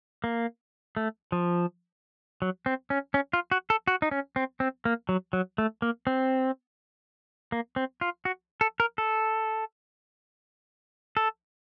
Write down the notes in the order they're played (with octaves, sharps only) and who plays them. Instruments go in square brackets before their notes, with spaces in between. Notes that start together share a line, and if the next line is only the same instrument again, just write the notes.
[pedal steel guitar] A#3
A3
F3
F#3
C4
C#4
C#4
F4
F#4
A4
F#4
D#4
C#4
C4
C4
A#3
F#3
F#3
A3
A#3
C4
A#3
C4
F4
F#4
A4
A#4
A4
A4